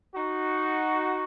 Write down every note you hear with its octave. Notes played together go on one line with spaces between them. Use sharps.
D#4 F#4